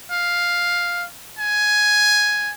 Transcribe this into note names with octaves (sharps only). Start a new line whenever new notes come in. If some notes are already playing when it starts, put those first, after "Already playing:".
F5
G#5